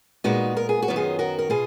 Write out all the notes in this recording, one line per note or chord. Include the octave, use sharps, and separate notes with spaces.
A#2 G#3 B3 D#4 F#4
A#4
G#4
F#4
F#2 D#3 F#3 B3
F4 G#4
F#4 A#4
A#4
B2 F4 G#4